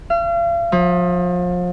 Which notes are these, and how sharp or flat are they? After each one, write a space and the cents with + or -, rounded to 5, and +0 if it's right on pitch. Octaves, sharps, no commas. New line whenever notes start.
F5 -40
F3 +35